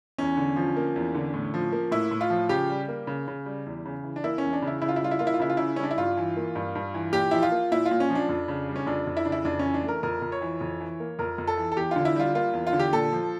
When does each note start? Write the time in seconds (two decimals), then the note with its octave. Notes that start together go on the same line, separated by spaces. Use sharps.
0.18 E2 C#4
0.37 D3
0.56 F3
0.77 A#3
0.96 E2
1.14 D3
1.34 A2
1.54 F3
1.73 A#3
1.92 A2 E4
2.11 A2
2.21 F4
2.30 F3
2.49 C#3 G4
2.70 G3
2.88 A#3
3.07 C#3
3.28 C#3
3.46 G3
3.66 E2
3.86 C#3
4.04 E3
4.16 D4
4.24 A#3 E4
4.38 E2 C#4
4.53 D4
4.62 C#3
4.67 E4
4.82 C#3 E4
4.89 F4
4.96 E4
5.01 G3 F4
5.11 E4
5.19 A#3 F4
5.27 E4
5.34 F4
5.40 C#3 E4
5.50 F4
5.57 C#3 E4
5.76 G3 C#4
5.83 D4
5.91 E4
5.98 G2 F4
6.17 E3
6.37 A#3
6.55 G2
6.75 G2
6.94 E3
7.13 A#2 G4
7.31 F3 E4
7.42 F4
7.52 A#3
7.72 A#2 E4
7.86 F4
7.91 A#2
8.00 C#4
8.10 F3
8.15 D4
8.29 F2
8.48 C#3
8.68 G3
8.76 C#4
8.87 F2 D4
9.07 F2
9.17 E4
9.25 C#3 D4
9.32 E4
9.45 F2 D4
9.59 E3 C#4
9.74 D4
9.83 A3
9.88 A#4
10.03 F2 A#4
10.22 F2
10.32 C#5
10.42 E3
10.61 F2
10.80 E3
11.00 A#3
11.19 F2 A#4
11.38 F2
11.47 A4
11.57 E3
11.72 A4
11.77 E2 G4
11.91 D3 F4
12.05 E4
12.16 G3 F4
12.35 A#3 F4
12.53 E2
12.67 F4
12.73 D3
12.79 G4
12.93 A#2 A4
13.12 F3